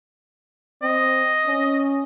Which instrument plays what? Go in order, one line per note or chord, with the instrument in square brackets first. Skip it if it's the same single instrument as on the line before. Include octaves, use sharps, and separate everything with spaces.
[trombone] C4 [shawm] D#5
[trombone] C#4